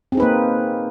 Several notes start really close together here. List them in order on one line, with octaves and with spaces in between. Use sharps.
C4 G#4 D#4 B4 A#3